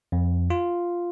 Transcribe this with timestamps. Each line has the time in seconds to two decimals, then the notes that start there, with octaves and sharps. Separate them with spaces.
0.12 F2
0.50 F4